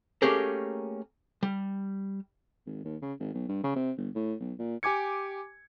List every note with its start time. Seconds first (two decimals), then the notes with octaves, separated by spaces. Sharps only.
0.22 A3 A#3 C#4 G4 G#4 A#4
1.43 G3
2.66 G#1
2.85 D#2
3.02 C#3
3.20 G#1
3.34 B1
3.49 G2
3.64 C#3
3.76 C3
3.98 G1
4.15 A2
4.40 B1
4.59 A#2
4.83 G4 G#5 D6 G#6 C#7